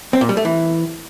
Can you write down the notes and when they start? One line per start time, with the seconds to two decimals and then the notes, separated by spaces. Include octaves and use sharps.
0.13 C4
0.21 A#2
0.29 G3
0.37 A3
0.45 E3